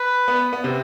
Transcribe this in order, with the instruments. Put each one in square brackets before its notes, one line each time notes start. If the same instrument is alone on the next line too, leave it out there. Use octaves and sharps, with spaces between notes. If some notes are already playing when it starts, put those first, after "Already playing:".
Already playing: [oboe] B4
[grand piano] B3
B3
C3 C4